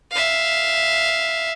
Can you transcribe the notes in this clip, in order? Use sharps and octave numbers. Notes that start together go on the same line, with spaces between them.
E5 F5